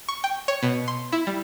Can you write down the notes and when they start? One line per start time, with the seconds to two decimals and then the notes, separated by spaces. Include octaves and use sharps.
0.08 C#6
0.24 G5
0.48 C#5
0.63 B2
0.88 C6
1.12 E4
1.27 G3